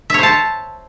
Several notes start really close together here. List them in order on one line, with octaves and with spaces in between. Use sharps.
E5 C#5 C5 A5